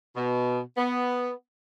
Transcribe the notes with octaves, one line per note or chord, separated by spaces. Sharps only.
B2
B3